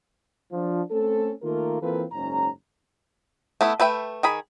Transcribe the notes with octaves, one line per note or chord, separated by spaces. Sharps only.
F3 D4 F4
A3 C4 C#4 A4
D#3 A3 A#3 F4 A#4
E3 A#3 C4 F4 A4 B4
F#1 G#2 C#4 A#5
A3 B3 E4
A3 B4 E5 G5
D#3 G#4 B5